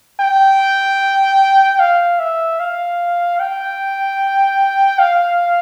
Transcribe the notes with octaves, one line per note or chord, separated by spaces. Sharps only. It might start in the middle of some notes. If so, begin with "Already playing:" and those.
G5
F5
E5
F5
G5
F5